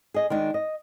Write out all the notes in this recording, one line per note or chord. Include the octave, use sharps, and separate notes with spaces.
G#4 D#5
D#3 G#3 D4
D#5